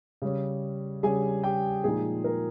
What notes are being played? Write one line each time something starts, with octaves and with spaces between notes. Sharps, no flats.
C#3 G3 C#4
C#3 G3 C#4 G#4 G#5
G4 G5
A#2 F3 G#3 D#4 G#4
A#4